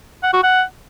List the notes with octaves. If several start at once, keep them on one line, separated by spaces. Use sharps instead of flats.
F#5
F#4
F#5